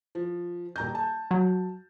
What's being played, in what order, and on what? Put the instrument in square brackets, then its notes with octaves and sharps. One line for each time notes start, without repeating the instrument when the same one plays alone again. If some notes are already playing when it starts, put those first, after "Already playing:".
[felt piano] F3
D#1 A#5 G6
A5
[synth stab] F#3